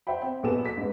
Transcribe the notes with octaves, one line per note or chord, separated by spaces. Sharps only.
C5 E5 F#5 G5 B5
C4
B1 A#2 B3 G#4 A4 E7
B6
G#2 B3